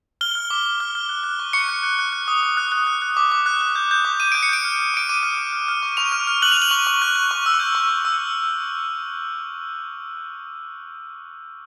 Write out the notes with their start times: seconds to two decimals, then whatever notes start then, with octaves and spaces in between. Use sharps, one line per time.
0.21 F6 G7
0.35 F6
0.50 D6
0.66 D6
0.80 F6
0.95 F6
1.09 F#6
1.24 F#6
1.39 C#6
1.53 C#6 C#7
1.68 F#6
1.83 F#6
1.99 F#6
2.13 F#6
2.28 D#6
2.43 D#6
2.57 F#6
2.72 F#6
2.87 F#6
3.02 F#6
3.17 D6
3.32 D6
3.46 F#6
3.61 F#6
3.75 G6
3.91 G6
4.05 D6
4.20 D6 D#7
4.32 G6 D7
4.43 C#7
4.49 G6 D7
4.65 F6
4.79 F6
4.94 D6 D7
5.09 D6 D#7
5.23 F6
5.38 F6
5.53 F6
5.68 F6
5.82 C#6
5.97 C#6 F7
6.12 F6
6.27 F6
6.42 F#6 F#7
6.52 F7
6.57 F#6 F#7
6.71 C#6
6.87 C#6
7.02 F#6
7.16 F#6
7.31 C#6
7.46 E6
7.60 G6
7.75 C#6
7.89 C#6
8.05 E6